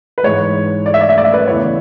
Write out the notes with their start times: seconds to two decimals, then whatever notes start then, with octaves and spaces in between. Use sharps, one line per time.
0.18 B4
0.23 G#2 E3 G#3 C#5
0.86 D5
0.94 E5
1.01 D5
1.09 E5
1.18 D5
1.25 E5
1.32 B4 D5
1.47 E2 C#3 E3 A3 C#5